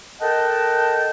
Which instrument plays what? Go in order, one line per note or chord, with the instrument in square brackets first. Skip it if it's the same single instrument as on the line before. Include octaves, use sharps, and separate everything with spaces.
[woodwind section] A4 A#4 D#5 F#5 G5 A5